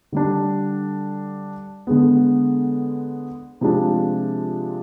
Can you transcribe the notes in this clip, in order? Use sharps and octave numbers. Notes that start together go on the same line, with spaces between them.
D3 G3 D4
D3 G#3 B3
C3 F3 G#3 D4 F4